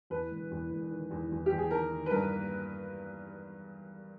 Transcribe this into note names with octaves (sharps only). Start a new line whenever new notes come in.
E2 B4
E1
E2
E1
D#3
E2
E2
G4
E2
G#4
D#3 A#4
D#3
B4
G2 A#4
A#3